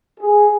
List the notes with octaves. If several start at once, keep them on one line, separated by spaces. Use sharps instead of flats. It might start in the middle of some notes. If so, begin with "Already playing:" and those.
G#4